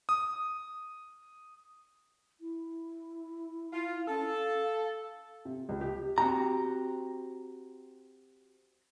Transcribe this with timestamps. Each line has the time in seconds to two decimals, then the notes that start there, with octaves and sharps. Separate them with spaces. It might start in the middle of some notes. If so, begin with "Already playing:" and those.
0.09 D#6
2.41 E4
3.73 F4
4.08 C#4 A4
4.27 F5
5.45 C3
5.69 C#2
5.81 G4
6.18 C4 F#4 G4 A#5